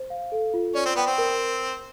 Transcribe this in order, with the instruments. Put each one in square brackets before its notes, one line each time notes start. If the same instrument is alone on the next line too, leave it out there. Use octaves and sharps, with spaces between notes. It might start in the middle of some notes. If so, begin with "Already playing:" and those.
Already playing: [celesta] C5
F5
A4
F4
[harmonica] C#4 [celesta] D5
[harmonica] C4
[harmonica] B3 [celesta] G5
[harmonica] C4
[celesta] A#4